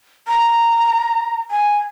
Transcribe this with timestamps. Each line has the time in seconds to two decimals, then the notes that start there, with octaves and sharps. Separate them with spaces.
0.28 A#5
1.51 G#5